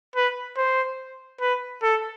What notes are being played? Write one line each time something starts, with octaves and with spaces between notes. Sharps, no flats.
B4
C5
B4
A4